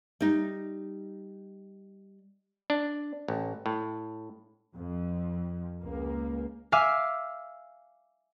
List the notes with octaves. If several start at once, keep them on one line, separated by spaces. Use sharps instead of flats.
G3 D#4
D4
A1
A2
F2
C#2 A#3
E5 F5 G#5 D6 E6 F6